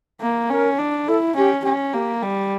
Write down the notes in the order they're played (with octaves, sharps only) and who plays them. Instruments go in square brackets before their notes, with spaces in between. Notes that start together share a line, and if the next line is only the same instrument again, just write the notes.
[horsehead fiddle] A#3
[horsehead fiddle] C#4 [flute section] A#4
[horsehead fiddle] D4
[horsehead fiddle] E4 [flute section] A4
[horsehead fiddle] C#4 [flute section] G4
[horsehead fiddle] C#4 [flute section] G4
[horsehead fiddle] A#3 [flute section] G4
[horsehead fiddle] G3